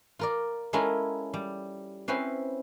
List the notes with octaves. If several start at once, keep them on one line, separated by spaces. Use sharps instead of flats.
F4 A#4 D5
G#3 C#4 E4 F4 A4 A#4
G3
C4 C#4 E4 B4 C5